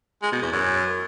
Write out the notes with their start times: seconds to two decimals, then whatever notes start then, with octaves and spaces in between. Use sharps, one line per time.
0.22 G#3
0.32 B2
0.42 E2
0.52 F#2